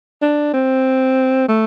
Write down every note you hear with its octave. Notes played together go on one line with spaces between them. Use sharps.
D4
C4
A3